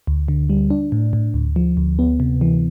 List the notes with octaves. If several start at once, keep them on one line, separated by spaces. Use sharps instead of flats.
D2
D3
G3
D4
A2
A2
D2
F3
D2
B3
C3
E3